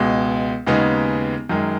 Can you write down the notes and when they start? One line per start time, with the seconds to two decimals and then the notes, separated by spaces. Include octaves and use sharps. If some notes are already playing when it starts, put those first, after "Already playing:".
Already playing: C#2 B2 G#3
0.67 D#2 C#3 G#3 B3 D#4
1.49 F#2 D#3 G#3